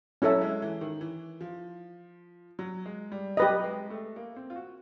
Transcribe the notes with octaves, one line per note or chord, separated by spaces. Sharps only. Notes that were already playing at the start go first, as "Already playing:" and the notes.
F#3 C#4 E4 A4 C#5 E5
G#3
E3
D#3
E3
F3
F#3
G#3
G3
F#3 G4 B4 D#5
G#3
A3
A#3
C4
F4
F#4